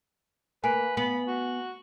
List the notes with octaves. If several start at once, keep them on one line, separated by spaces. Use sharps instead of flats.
A#3 B4 G#5
B3 B5
F#4